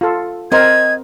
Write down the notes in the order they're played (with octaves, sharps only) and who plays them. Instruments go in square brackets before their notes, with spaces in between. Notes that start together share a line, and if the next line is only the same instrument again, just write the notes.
[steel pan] F4 A4
[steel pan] C4 A#4 C5 [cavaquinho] D#5 F#5 G#5 [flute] G#6